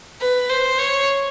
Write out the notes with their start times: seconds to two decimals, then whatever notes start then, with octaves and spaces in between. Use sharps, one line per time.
0.21 B4
0.50 C5
0.78 C#5